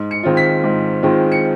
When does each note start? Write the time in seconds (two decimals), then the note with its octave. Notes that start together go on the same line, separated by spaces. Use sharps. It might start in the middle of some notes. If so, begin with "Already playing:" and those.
Already playing: G#2
0.11 C#7
0.24 D#3 G#3 C4 F4
0.37 B6
0.64 G#2
1.03 D#3 G#3 C4 F4
1.32 C#7